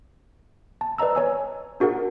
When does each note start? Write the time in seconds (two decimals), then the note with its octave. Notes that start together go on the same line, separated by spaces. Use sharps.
0.81 A5
0.98 B4 D5 D#5 A#5 E6
1.15 C#5 G#5 E6
1.80 D4 F#4 G#4 A#4 F#5